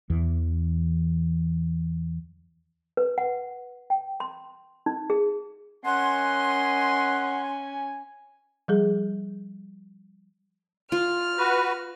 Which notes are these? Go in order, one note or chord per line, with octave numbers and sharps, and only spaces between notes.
E2 E3
B4
F#5
G5
C6
D#4
G#4
C#4 A#4 D#5 F#5 G#5 C6
F3 G3 G#4
F4 F6
F#4 B4